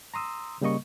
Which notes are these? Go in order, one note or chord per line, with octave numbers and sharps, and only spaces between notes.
A#5 C6 D#6 E6
C#3 G3 A#3 D#5 C#6